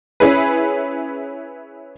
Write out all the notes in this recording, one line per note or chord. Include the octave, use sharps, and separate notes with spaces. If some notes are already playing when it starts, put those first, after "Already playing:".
C#4 E4 G#4 B4